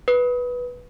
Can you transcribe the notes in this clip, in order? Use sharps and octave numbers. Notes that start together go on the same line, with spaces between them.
B4